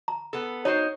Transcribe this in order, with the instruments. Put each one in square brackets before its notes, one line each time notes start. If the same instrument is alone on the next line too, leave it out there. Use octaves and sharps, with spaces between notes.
[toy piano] A#5
[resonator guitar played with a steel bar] B3 A4
[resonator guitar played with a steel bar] D#4 F#4 C5 [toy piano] C#5